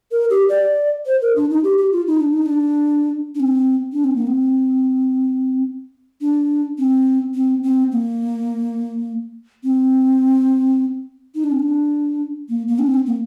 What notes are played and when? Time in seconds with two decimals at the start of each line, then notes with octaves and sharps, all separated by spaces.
0.12 A#4
0.30 G4
0.49 D5
1.06 C5
1.22 A#4
1.36 D4
1.50 D#4
1.64 G4
1.78 G4
1.92 F4
2.07 D#4
2.21 D4
2.33 D#4
2.46 D4
3.35 D4
3.40 C4
3.93 D4
4.04 C4
4.16 A#3
4.27 C4
6.21 D4
6.78 C4
7.35 C4
7.63 C4
7.92 A#3
9.64 C4
11.35 D#4
11.44 D4
11.52 C4
11.60 D4
12.49 A#3
12.68 A#3
12.79 D4
12.87 C4
13.07 A#3